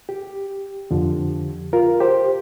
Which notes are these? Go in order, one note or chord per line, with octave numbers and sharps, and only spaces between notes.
G4
F2 D3 F3
F4 A#4
G4 C5